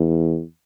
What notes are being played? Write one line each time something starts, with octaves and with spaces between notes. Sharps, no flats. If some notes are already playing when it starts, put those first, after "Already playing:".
Already playing: E2